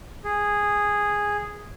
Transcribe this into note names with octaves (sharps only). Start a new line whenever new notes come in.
G#4